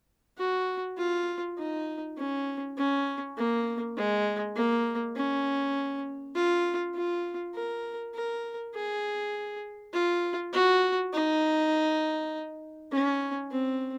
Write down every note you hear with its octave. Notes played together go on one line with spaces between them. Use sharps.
F#4
F4
D#4
C#4
C#4
A#3
G#3
A#3
C#4
F4
F4
A#4
A#4
G#4
F4
F#4
D#4
C#4
C4